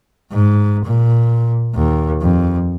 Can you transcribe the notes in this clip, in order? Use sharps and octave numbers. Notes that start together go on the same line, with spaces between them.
G#2
A#2
D#2
F2